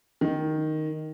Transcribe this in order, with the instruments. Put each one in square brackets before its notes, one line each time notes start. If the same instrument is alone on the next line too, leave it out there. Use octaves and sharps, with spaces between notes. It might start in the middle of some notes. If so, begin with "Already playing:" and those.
[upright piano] D#3